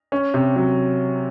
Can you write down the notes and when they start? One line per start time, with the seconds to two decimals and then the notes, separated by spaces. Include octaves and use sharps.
0.12 C#4
0.34 C3
0.56 F#3